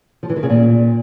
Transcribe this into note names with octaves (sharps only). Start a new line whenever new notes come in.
F3
E3
D#3
C#3
A#2